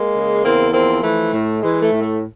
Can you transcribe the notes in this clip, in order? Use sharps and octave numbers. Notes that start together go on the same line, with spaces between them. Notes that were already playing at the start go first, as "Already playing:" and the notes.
Already playing: G#3 A#3
C#3
E2 A#3 C4
F3 A#3 C4
E3 A3
A2
E3 G#3
A3
A2
A3